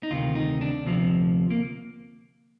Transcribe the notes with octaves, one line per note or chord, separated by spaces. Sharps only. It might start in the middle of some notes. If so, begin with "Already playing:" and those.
D#4
D2 C3 D#3 F4
D#4
D4
D2 C3 F3
A#3